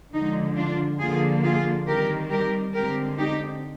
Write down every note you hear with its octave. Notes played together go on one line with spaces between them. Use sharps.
D3 F3 G#3 D#4
D4 F4
D3 F3 A#3 F4 G#4
F4 G#4
D#3 G3 C4 G4 A#4
G4 A#4
D3 G#3 C4 G4 A#4
D#4 G4